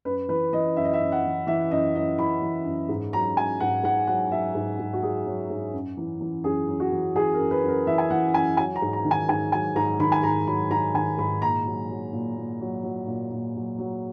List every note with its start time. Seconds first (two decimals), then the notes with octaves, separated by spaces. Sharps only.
0.05 F#2 B4
0.28 E3 B4
0.53 E3 D#5
0.76 F#2 E5
0.85 D#5
0.93 E5
1.00 F#2
1.12 F#5
1.24 E3
1.47 E3 E5
1.71 F#2 D#5
1.94 F#2 D#5
2.18 E3 B5
2.42 E3
2.65 F#2
2.89 G#2
3.13 F#3 A#5
3.37 F#3 G#5
3.60 G#2 F#5
3.83 G#2 F#5
4.07 F#3 F#5
4.31 F#3 E5
4.55 G#2
4.79 G#2
4.93 F#4
5.03 F#3 G#4
5.26 F#3
5.50 G#2
5.73 F#2
5.97 E3
6.20 E3
6.44 F#2 G#4
6.68 F#2
6.80 F#4
6.92 E3
7.15 E3 G#4
7.34 A#4
7.39 F#2
7.51 B4
7.64 F#2 A#4
7.87 E3 E5
7.98 G#5
8.10 E3 F#5
8.34 F#2 G#5
8.57 F#3 G#5
8.76 A#5
8.82 G#2
8.93 A#5
9.05 D#3
9.11 G#5
9.28 G#2 G#5
9.52 F#3 G#5
9.76 G#2 A#5
9.99 D#3 B5
10.12 G#5
10.23 G#2 A#5
10.47 F#3 B5
10.70 G#2 A#5
10.94 D#3 G#5
11.18 G#2 B5
11.41 A#2 A#5
11.65 F#3
11.90 F#3
12.13 A#2
12.36 A#2
12.60 F#3
12.83 F#3
13.07 A#2
13.31 A#2
13.55 F#3
13.78 F#3